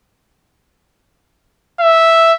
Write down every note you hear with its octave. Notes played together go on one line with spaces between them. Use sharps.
E5